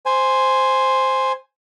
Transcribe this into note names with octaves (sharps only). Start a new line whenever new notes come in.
C5 G#5